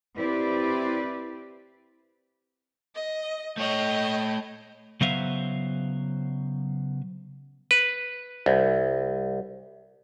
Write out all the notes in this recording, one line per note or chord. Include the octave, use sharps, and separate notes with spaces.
C4 E4 G4 B4 D5
D#5
A3 C#5 D#5 G6
C#3 F#3 B3 C5 E5 F5
B4
C2